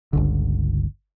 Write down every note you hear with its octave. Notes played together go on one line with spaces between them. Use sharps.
G1 C#2 D3